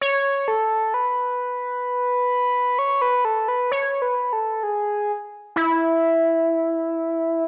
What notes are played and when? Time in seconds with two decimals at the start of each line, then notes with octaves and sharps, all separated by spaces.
0.01 C#5
0.48 A4
0.94 B4
2.79 C#5
3.02 B4
3.25 A4
3.48 B4
3.72 C#5
4.02 B4
4.33 A4
4.63 G#4
5.56 E4